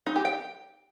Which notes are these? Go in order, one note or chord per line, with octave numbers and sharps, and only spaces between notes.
D#4
G4
G5